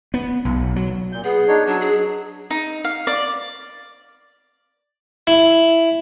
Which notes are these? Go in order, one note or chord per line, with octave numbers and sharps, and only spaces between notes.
B3
B1
F#3
A#2 G6
B3 G#4
D4 D#4 C#5
F#3 D4
G#4
D#4
F5
D5
E4